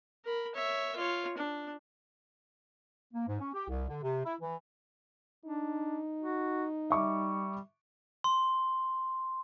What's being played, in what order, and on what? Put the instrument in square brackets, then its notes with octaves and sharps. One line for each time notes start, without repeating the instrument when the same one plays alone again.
[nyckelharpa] A#4 B5
C#5 E5
F4 C#5
D4
[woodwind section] A#3
G#2
C#4
G4
C2
D3
C3
E4
E3
[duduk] D4 [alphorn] D#4
[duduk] F#4
[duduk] G3 [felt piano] E5 C#6 D6
[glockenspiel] C6